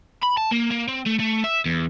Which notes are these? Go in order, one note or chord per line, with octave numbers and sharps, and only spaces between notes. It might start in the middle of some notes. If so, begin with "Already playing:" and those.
B5
A5
A#3
A#3
C4
A3
A3
E5
E2